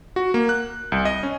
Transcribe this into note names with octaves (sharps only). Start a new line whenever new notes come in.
F#4
A#3
F#6
C2
D#5
C#4